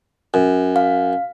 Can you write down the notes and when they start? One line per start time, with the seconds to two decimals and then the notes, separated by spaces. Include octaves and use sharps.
0.34 F#2
0.76 F5